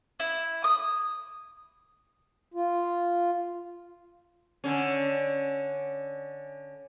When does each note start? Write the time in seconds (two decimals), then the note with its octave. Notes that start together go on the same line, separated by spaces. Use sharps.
0.20 E4
0.64 D#6
2.54 F4
4.64 D3 C#4